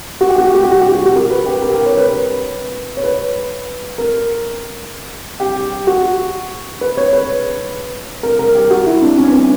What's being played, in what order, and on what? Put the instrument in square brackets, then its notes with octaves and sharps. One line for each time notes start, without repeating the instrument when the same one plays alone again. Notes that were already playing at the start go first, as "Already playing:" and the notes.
[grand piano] F#4
G4
F#4
G4
F#4
G4
F#4
G4
F#4
G4
F#4
A#4
B4
G4
A#4
G4
A#4
C#5
B4
C#5
B4
A#4
G4
F#4
B4
C#5
B4
A#4
A#4
G4
F#4
E4
D4
C#4
B3
C#4